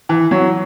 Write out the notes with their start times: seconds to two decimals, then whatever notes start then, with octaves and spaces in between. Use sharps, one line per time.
0.09 E3
0.31 F#3